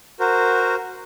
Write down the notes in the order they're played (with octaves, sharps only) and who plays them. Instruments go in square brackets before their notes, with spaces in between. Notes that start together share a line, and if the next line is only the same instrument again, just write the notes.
[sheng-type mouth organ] F#4 A#4 C5